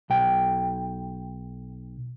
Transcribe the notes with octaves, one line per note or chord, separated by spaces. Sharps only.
B1 G5